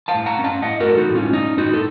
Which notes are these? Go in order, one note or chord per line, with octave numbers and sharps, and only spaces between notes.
F5 A5
A2
F#5 A#5
C#4
F5 A5
A2 D#5 F#5
F#4 A#4
A3 A4
D#4 F#4
A2
C#4 F4
C#4 D#4
A2 D#4 F#4
A4